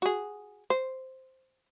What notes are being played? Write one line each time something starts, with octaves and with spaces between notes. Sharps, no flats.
F#4 G#4
C5